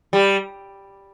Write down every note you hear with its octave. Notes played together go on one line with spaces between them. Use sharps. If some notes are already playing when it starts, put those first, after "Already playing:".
G3